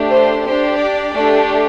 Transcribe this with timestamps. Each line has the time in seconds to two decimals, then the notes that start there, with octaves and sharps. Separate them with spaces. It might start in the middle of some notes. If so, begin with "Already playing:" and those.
Already playing: A3 D4 G4
0.10 C5
0.44 D4 G4 C5
0.78 D5
1.12 A3 D4 G4